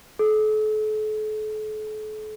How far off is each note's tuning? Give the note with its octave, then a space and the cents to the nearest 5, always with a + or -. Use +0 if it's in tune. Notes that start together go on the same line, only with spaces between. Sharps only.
A4 -40